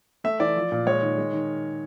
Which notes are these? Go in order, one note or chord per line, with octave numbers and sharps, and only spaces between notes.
A3 E5
E3 D5
F3
A#2
G#3 C#5
D#3
G#3
D#3